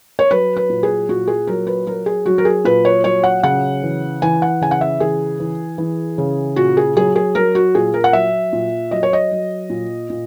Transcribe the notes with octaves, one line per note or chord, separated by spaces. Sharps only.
C#5
F#3 B4
B4
A#2
G#4
A#2 F#4
G#4
F#3 A#4
B4
F#3 A#4
G#4
F#3 F#4
A#4
G#4
A#2 B4
C#5
F#3 C#5
F#5
C#3 F#5
E3
E3 G#5
F#5
C#3 G#5
F#5
E5
E3 G#4
E3
E3
C#3
A#2 F#4
G#4
F#3 G#4
G#4
F#3 A#4
F#4
A#2 G#4
A#4
F#5
F#3 E5
A#2
F#3 D#5
C#5
D#5
F#3
A#2
A#2